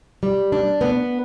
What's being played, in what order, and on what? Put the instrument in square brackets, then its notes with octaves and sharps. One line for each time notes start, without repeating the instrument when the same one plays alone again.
[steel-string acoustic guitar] G3
D4
B3